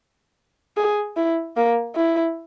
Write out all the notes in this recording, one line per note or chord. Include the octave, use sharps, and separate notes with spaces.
G#4
E4
A#3
E4